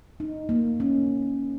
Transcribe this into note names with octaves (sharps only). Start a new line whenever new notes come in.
D#4
A#3
C#4